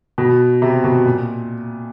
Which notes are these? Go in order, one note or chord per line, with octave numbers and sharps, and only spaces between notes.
B2
C3
B2
A#2